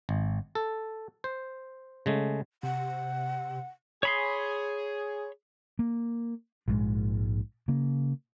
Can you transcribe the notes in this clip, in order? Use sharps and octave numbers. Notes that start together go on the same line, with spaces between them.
G#1
A4
C5
C#3 G#3 A3
C3 F#5
G#4 C#5 B5 C6
A#3
A#1 G#2 G#3
C#3 A#3